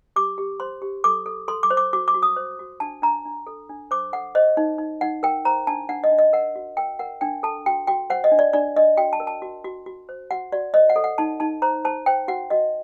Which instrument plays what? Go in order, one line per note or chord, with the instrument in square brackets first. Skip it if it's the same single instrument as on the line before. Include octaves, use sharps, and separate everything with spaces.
[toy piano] G4 D6
G4
C5 C6
G4
A4 D6
A4
A4 C6
D6
C5
D6
F#4 D6
D6
F#4
D#6
C5
F#4
D4 A5
D4 A#5
D4
A4
D4
C5 D6
A4 F#5
C5 D#5
D#4
D#4
D#4 F#5
A#4 G5
C5 A#5
D4 A5
D4 F#5
D#5
D4
D#5
A#4 F#5
F#4
A#4 G5
A#4 F#5
D4 G5
A4 A5
F#4 G5
F#4 G5
C5 F#5
D#5
D4
D5
D4 D5
D4 D#5
F#4 G5
A5
A#4
A5
F#4
F#4
F#4
C5
F#4 F#5
F#4 D5
C5 D#5
F#5
A4
F#5
D#4 A5
D#4 A5
C5 A#5
C5 A5
C5 G5
F#4 F#5
F#4 D#5